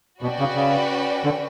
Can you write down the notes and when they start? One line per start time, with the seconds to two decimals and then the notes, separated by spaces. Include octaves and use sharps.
0.22 B2 C#4 F#4 B4 D5 G5
0.39 C#3
0.55 C#3
1.24 D3